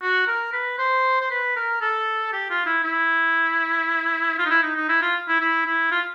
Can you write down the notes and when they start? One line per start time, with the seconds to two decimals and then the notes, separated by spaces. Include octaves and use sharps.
0.02 F#4
0.27 A#4
0.53 B4
0.78 C5
1.21 C5
1.30 B4
1.56 A#4
1.81 A4
2.33 G4
2.50 F4
2.66 E4
2.84 E4
4.38 F4
4.46 D#4
4.51 E4
4.63 D#4
4.76 D#4
4.89 E4
5.02 F4
5.28 E4
5.41 E4
5.66 E4
5.91 F4